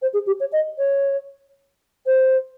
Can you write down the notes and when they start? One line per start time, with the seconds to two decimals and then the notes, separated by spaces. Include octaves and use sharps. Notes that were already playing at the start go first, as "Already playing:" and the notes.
0.01 C5
0.13 G#4
0.26 G4
0.40 C#5
0.52 D#5
0.78 C#5
2.06 C5